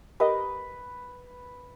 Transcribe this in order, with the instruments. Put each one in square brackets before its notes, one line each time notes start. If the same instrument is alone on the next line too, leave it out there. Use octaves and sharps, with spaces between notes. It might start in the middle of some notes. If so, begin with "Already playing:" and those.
[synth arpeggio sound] G4 A#4 D#5 [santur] B4